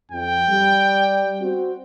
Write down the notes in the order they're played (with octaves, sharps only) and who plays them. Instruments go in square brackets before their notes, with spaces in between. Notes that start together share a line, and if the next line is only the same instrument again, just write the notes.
[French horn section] F2 [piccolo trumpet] G5
[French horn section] G3
C4 F#4